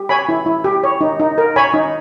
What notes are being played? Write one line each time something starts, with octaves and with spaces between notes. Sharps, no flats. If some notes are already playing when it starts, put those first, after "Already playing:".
Already playing: G4
C#5 G#5 B5
E4
E4
G4
C#5
D#4
D#4
A#4
C#5 G#5 B5
D#4